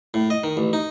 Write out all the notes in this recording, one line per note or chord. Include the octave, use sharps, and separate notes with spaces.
A2
D#5
D#3
A1
D#4